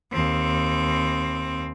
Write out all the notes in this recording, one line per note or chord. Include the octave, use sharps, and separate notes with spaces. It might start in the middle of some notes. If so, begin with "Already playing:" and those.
D#2 C4